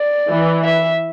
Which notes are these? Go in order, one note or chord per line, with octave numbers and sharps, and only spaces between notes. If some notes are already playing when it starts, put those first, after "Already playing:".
Already playing: D5
E3
E5